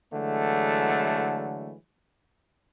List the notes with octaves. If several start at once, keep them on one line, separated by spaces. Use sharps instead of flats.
D3 E3 F#3 G#3 A3